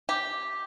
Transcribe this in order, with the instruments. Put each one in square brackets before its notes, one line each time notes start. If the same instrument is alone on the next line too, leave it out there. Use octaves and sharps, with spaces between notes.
[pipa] G4